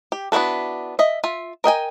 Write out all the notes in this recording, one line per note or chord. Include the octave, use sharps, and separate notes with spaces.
G4
B3 D4 E4 F#4 A4
D#5 E5
F4 E5
A#4 D#5 G5 G#5